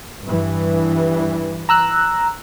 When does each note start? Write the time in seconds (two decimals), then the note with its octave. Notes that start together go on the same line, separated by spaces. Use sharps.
0.24 G2 E3
1.69 A#5 E6 F#6